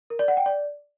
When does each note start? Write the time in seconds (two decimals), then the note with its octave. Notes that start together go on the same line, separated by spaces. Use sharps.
0.10 A#4
0.19 D5
0.28 F#5
0.37 G5
0.46 D5